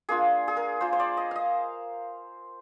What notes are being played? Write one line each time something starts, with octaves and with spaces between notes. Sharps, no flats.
A#3 D4 F4 G#4
G#4
A#4
A#3 F4 C5
C5
D5
D#5
D#5 F5